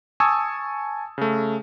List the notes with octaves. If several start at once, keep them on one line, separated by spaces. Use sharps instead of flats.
G#5 A5 C#6 D#6 E6 G#6
C#3 A3